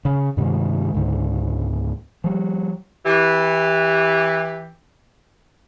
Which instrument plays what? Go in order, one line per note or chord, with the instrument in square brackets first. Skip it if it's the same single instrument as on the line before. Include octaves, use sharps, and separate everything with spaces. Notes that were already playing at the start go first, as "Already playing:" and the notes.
[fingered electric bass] C#3
G2 C3 D#3 G#3
C#2 G#2 D3
F3 G3
[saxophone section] E3 G4